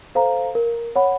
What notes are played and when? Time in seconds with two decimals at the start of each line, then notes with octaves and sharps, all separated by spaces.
0.15 A4 C5 F5 A#5
0.55 A#4
0.96 C#5 F#5 B5